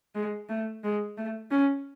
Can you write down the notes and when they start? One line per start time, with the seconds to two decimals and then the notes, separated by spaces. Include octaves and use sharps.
0.15 G#3
0.49 A3
0.84 G#3
1.17 A3
1.51 C#4